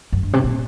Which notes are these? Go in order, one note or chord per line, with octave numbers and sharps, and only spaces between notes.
F#2
G2
C3
A#2